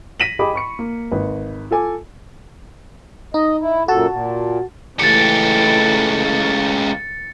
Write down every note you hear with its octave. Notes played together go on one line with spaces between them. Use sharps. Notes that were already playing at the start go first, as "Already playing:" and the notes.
A#6 B6 D#7 E7 F#7
G4 G#4 D#5 G5 B5 D6
B5 C#6 C#7
A#3
G#1 B4
F4 A4 G#5 D6
D#4 D#5
E4
F#2 A#2 F#4 A4 A5
A#2
C#2 E3 A3 G4 A6 C#7